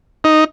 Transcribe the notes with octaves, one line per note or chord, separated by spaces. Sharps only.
D#4